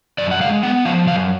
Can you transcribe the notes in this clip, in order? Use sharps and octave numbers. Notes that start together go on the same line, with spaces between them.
F#2 D5
F#5
G#3 F5
B3 F#5
F3 F5
F#2 F5